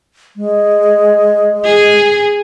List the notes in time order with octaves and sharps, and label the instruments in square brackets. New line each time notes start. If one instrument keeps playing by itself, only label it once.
[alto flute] G#3
[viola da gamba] G#4